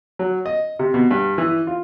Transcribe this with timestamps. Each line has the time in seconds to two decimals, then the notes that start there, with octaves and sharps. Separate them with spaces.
0.19 F#3
0.46 D#5
0.79 C3
0.94 B2
1.11 G2
1.38 E3
1.67 F4